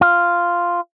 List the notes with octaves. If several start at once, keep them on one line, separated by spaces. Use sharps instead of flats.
F4